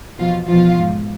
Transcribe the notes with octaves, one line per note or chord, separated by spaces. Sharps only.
E2 B2 F3 F4
E2 B2 F3 F4
G#2 F3